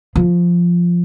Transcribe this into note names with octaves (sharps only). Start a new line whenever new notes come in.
F3